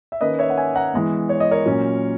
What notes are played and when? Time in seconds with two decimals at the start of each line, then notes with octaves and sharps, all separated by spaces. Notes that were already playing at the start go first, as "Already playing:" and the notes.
0.12 E5
0.21 D#3 A#3 C#4 B4 D#5
0.39 C#5 E5
0.50 F#5
0.58 E5 G#5
0.75 F#5 A#5
0.93 E3 G#3 B3
1.29 C#5
1.40 D#5
1.51 A#4 C#5
1.66 A#2 F#3 C#4